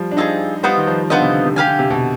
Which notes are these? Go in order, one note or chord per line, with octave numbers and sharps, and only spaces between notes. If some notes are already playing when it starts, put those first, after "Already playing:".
Already playing: F3 G3
D4
C4 D#4 F4 G#4
G3 B3 F4 C5 D#5
D#3
F3
D3 B3 F4 C5 D#5
C3
D3
C3
D3 G4 B4 F5 G#5
D3
C3
B2